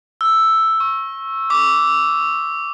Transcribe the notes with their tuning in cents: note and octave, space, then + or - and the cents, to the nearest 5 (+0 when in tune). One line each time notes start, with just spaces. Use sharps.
E6 +0
C#6 -25
D6 -15